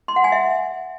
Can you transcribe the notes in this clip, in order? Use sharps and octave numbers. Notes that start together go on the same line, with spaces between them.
C6
F#5
G#5
E5